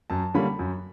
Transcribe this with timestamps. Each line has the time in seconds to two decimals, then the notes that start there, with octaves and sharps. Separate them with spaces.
0.10 F#2 A5
0.34 D3 G3 A#3 C#4 B5
0.59 F#2